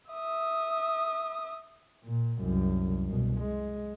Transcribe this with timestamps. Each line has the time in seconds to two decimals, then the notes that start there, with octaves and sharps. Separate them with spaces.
0.10 E5 D#6
2.05 A#2
2.39 C2 F#2
3.08 C2 B2
3.40 G#3